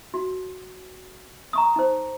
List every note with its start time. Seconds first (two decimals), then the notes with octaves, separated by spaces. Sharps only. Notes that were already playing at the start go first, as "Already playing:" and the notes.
0.14 F#4
1.53 A#5 C#6 D#6
1.76 D#4 C5